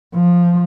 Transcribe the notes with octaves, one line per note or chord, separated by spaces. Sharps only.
F3